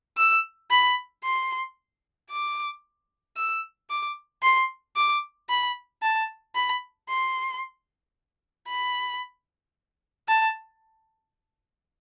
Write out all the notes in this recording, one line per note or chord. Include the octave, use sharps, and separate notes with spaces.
E6
B5
C6
D6
E6
D6
C6
D6
B5
A5
B5
C6
B5
A5